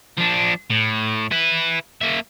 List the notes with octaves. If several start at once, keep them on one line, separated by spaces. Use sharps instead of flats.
F3 D4
A2
E4 B4
A#3 E5